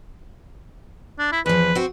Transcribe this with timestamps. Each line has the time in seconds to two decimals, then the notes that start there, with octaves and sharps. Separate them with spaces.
1.19 D4
1.32 E4
1.46 E2 F3 B4
1.75 C4 F#4